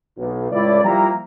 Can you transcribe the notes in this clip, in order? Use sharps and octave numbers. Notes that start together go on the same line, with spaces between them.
B1
C#2 A2 E4 D5
F3 G3 A#3 E4 G5 A#5